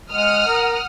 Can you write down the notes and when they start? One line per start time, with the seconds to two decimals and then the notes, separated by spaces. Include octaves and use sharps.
0.11 G#3 F#5 D#6 F6
0.48 A#4